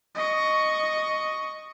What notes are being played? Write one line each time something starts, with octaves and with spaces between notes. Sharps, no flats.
D#5 C#6